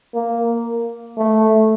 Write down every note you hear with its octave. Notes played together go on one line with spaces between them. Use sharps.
A#3
A3